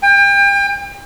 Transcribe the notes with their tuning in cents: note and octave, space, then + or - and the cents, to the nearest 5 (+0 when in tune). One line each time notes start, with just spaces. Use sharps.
G5 +35